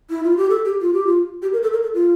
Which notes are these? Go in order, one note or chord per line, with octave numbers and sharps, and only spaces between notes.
E4
F4
G4
A4
G4
F4
G4
F4
G4
A#4
A4
A#4
A4
F4